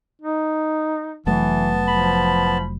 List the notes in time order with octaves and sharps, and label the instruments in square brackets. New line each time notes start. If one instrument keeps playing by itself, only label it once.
[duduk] D#4
[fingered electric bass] F1 F#3 A3 [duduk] E3 [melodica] B3 A5
[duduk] F3 [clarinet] B5